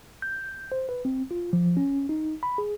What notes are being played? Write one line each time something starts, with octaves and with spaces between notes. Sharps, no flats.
G6
C5
B4
C4
F4
F3
C#4
D#4
B5
G#4